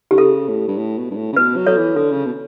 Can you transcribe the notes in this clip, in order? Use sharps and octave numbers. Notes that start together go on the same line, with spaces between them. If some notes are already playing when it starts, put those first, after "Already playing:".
D3 G4
C#3 A4
A2
G2
A2
B2
G2
A2
C#3
B2 B4
F#3
F#3 A4 C#5
E3
D3 A4
C#3
B2